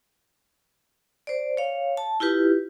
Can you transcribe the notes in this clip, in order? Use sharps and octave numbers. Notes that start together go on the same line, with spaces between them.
C5 D5
C#5 F5
A5
E4 F4 G4 B4